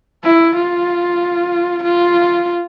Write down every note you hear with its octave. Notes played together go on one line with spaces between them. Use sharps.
E4
F4
F4